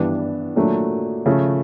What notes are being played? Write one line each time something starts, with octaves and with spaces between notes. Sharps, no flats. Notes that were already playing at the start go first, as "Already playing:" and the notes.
Already playing: G2 E3 G3 B3 D4
A#2 F#3 A3 D4
C#3 F3 A3